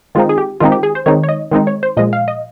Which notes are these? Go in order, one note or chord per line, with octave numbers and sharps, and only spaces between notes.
D#3 G#3 C4 D#4 F4
G#4
G4
D#3 G#3 C4 D#4 F4
G4
G#4
C5
D#3 G#3 C4 D#4 C#5
C#5
D#5
D#3 G#3 C4 D#4
C#5
C5
A#2 F3 G#3 D#5
F5
D#5